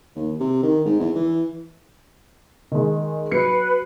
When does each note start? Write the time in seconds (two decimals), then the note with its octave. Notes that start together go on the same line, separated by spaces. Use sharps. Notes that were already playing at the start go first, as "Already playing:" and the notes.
0.16 D#2
0.40 C3
0.63 D#3
0.86 G#2
1.00 E2
1.16 E3
2.72 D#3 G#3
3.32 F#3 B4 C7 C#7